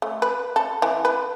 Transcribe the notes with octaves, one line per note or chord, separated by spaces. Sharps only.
A3
B4
A4
E3
B4